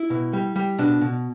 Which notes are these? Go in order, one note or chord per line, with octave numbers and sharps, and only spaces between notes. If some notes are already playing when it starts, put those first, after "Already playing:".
Already playing: E4
B2
G3
G3
B2 D4
B2